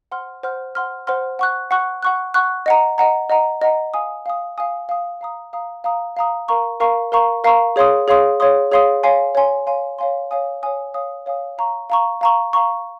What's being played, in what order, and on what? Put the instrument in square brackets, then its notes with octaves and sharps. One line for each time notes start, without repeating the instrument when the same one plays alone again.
[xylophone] C5 F#5 C6 F6
C5 F#5 C6 F6
C5 F#5 C6 F6
C5 F#5 C6 F6
F#5 C#6 F#6
F#5 C#6 F#6
F#5 C#6 F#6
F#5 C#6 F#6
D#5 F#5 A#5
D#5 F#5 A#5
D#5 F#5 A#5
D#5 F#5 A#5
F5 G#5 D#6
F5 G#5 D#6
F5 G#5 D#6
F5 G#5 D#6
F5 A#5 D#6
F5 A#5 D#6
F5 A#5 D#6
F5 A#5 D#6
A#4 F5 A#5 C#6
A#4 F5 A#5 C#6
A#4 F5 A#5 C#6
A#4 F5 A#5 C#6
G#4 C#5 F5 C6 D#6
G#4 C#5 F5 C6 D#6
G#4 C#5 F5 C6 D#6
G#4 C#5 F5 C6 D#6
C#5 F5 G#5 C6
C#5 F5 G#5 C6
C#5 F5 G#5 C6
C#5 F5 G#5 C6
C#5 F5 G#5 D#6
C#5 F5 G#5 D#6
C#5 F5 G#5 D#6
C#5 F5 G#5 D#6
F5 A#5 C#6
F5 A#5 C#6
F5 A#5 C#6
F5 A#5 C#6